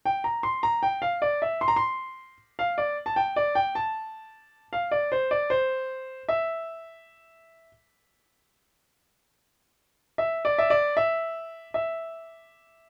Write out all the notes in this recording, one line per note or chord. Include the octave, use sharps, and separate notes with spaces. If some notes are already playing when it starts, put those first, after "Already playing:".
G5
A#5
C6
A#5
G5
F5
D5
E5
C6
A#5
C6
F5
D5
A5
G5
D5
G5
A5
F5
D5
C5
D5
C5
E5
E5
D5
E5
D5
E5
E5